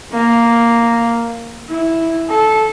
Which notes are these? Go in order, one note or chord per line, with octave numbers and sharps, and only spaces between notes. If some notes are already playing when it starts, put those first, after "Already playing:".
A#3
E4
A4